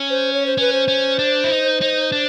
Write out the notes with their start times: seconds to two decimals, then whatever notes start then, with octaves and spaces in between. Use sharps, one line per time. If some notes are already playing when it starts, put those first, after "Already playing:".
Already playing: C#4
0.10 C5
0.33 C#5
0.46 C5
0.57 C#4 B4
0.73 C5
0.88 C#4
1.19 D4
1.44 E4
1.51 D#4
1.81 D#4
2.12 D4